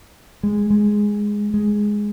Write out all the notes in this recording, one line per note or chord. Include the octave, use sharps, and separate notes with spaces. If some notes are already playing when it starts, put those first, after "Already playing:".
G#3
G#3
G#3